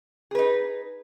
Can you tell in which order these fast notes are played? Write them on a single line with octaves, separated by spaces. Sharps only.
G#4 B4 D#4